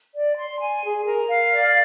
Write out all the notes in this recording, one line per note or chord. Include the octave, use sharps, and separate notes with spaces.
D5
C6
G#5
G#4
A#4
F5
D5